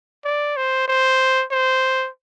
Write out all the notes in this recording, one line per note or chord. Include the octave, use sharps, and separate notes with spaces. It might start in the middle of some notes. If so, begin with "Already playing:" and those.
D5
C5
C5
C5